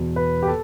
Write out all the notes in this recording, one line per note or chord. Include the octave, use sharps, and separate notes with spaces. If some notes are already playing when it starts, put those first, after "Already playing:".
Already playing: E2 B2
B4
G4
A4